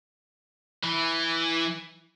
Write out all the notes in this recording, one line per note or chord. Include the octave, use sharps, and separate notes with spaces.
E3